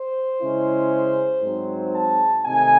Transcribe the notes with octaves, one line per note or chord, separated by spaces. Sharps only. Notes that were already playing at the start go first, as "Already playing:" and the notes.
Already playing: C5
C#3 G#3 C#4 E4
G#2 F#3 C4
A5
C3 D#3 A3 D#4 G#5